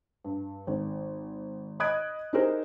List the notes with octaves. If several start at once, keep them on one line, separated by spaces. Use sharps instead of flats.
G2
G#1
D#5 B5 D#6 F#6 G#6 D7
D#4 E4 G4 G#4 A#4 C5